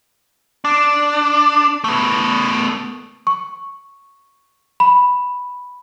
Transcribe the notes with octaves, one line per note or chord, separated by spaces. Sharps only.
D4
A3 B3
C#6
B5